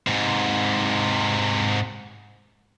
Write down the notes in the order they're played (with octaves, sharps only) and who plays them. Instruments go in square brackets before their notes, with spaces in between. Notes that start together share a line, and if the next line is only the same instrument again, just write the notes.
[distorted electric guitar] G#2 C3